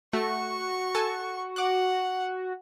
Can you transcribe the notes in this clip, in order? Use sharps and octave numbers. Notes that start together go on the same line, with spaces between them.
A3 F#4 C#6
A4 G#5 A5
F#5 D6 F#6